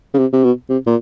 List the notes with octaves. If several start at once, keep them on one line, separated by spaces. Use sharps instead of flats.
C#3
C3
C3
B2
C3
A#2